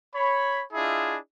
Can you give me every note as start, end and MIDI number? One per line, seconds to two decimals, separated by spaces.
0.14 0.63 73
0.14 0.63 83
0.73 1.17 62
0.73 1.17 64
0.73 1.17 65
0.73 1.17 68
0.73 1.17 75
0.73 1.17 76